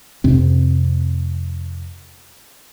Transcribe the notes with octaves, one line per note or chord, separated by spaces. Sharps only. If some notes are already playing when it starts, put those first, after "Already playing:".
F2 C3 C4